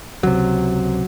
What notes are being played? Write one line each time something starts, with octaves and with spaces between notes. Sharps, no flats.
C#2 C3 F#3